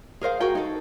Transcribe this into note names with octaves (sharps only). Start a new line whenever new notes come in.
G#4 A#4 C5 F5
F#4 G#4 A#4 G5
D#4 A4